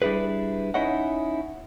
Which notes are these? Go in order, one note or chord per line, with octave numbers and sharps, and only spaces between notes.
G3 D4 E4 G#4 B4
C#4 D#4 E4 C#5 D#5 F#5